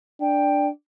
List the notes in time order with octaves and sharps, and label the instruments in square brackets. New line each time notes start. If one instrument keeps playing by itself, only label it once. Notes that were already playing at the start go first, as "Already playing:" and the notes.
[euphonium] D4 [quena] G5